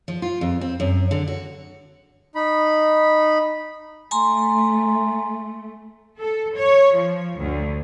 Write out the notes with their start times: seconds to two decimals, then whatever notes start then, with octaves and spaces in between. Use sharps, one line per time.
0.08 F3
0.22 F4
0.41 F2
0.61 C4
0.80 F#2
1.11 D3
1.27 F#4
2.35 D#4 B5
4.11 A3 G#5 A#5 C6
6.18 A4
6.54 C#5
6.94 F3
7.38 D2